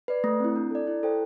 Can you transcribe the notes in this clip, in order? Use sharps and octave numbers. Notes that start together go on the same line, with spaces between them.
B4 D5
A3
C4 E4
D4
A4 D5
E4
A4 C5 G5